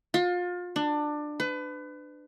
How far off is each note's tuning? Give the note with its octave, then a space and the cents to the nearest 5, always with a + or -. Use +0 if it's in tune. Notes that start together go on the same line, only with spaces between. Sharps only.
F4 +30
D4 +20
B4 +30